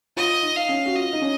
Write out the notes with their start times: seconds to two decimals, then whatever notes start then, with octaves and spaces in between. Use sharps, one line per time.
0.17 F4 D#5
0.42 D#4
0.56 F5
0.69 C#4
0.86 F#4
0.96 F4 D#5
1.13 D#4
1.22 C#4